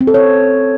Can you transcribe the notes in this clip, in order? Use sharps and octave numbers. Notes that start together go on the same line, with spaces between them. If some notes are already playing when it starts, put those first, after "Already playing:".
C4
A4
C#5